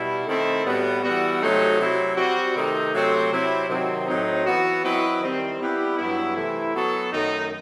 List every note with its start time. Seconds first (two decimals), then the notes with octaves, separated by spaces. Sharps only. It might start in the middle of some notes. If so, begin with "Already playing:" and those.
Already playing: B2 G3 E4
0.26 D#3 A3 C4 E4 A4
0.63 A2 G3 B3 F#4
1.02 E3 G3 B3 F#4
1.41 C3 F#3 A3 C4 D#4
1.78 C3 F#3 C4 E4
2.16 G3 C4 F#4
2.54 C3 D#3 A3 D#4
2.92 C3 F#3 A3 C4 F#4
3.30 C3 F#3 C4 E4
3.68 C3 D#3 F#3 C4
4.07 A2 F#3 C4 D#4
4.45 E3 B3 F#4
4.83 F#3 C4 E4 B4 D#5
5.21 D#3 G3 C4 E4
5.59 G3 B3 E4 G4 B4
5.97 G2 F#3 B3 E4
6.35 C3 E3 A3 E4
6.74 F#3 B3 F#4 A4
7.11 F#2 D#3 A3 D#4